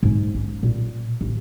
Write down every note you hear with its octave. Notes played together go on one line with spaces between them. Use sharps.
G#2
C#4
A#2
A1